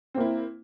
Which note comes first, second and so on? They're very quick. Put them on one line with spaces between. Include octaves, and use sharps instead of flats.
C4 A#3 E4